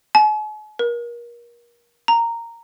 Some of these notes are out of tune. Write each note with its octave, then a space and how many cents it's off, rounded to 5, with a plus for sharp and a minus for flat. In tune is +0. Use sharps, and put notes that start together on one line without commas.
G#5 +45
A#4 +30
A#5 -10